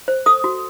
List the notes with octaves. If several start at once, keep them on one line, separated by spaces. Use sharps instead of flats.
C5
A4 D#6
F#4